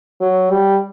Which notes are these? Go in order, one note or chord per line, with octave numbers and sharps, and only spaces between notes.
F#3
G3